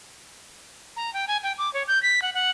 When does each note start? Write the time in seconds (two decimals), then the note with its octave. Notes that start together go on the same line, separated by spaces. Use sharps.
0.97 A#5
1.14 G5
1.28 G#5
1.43 G5
1.58 D6
1.74 C#5
1.88 G6
2.03 B6
2.22 F#5
2.34 F#5